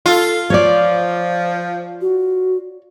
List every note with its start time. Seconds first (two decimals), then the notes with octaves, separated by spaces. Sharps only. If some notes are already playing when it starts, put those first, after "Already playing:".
0.06 F4 A4
0.50 F3 C#5 D5
2.01 F#4